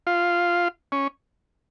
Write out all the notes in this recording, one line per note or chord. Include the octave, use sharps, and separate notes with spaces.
F4
C#4